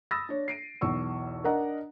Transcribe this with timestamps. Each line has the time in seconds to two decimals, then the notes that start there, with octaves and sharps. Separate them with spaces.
0.11 B5 D#6 E6 A6 A#6
0.29 D4 C#5
0.48 C7 D7 D#7
0.81 B1 E2 C#6 E6
1.44 D4 A#4 D#5 F#5 A#5